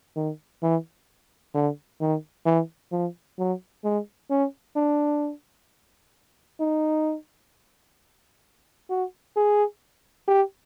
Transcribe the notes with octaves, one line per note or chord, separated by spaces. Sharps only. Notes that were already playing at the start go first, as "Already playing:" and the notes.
D#3
E3
D3
D#3
E3
F3
F#3
G#3
C#4
D4
D#4
F#4
G#4
G4